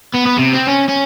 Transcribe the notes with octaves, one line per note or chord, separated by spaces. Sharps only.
B3
B3
C3
C4
C#4
C#4